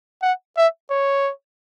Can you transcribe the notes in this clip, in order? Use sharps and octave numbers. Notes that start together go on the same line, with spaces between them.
F#5
E5
C#5